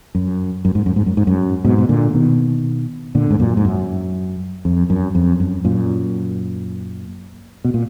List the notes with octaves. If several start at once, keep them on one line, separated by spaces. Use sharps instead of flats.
F#2
F#2
G#2
F#2
G#2
F#2
G#2
F#2
G#2 B2
B2
A#2 D3
B2 D#3
A#2 D3
G#2
F#2 A#2
G#2
F#2
F2
F#2
F2
F#2
F#2 A#2
B2
A#2